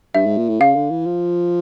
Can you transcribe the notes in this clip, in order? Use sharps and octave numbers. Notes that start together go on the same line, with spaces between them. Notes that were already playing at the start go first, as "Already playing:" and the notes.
G2 E5
G#2
A#2
A2
C#3 F5
D3
E3
F3